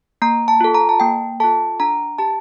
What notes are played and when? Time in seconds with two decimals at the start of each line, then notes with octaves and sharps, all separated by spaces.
0.22 A#3 A#5
0.48 A5
0.61 F4 A4
0.74 A#5
0.89 A5
1.00 A#3 G5
1.40 F4 A4 A5
1.80 D4 A#5
2.18 G4 A5